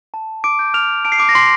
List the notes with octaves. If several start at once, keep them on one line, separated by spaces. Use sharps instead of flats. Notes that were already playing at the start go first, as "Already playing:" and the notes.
A5
D6 D7
G6
F6 F7
A5 D7
C7
D6 D7
A#6
C6 C7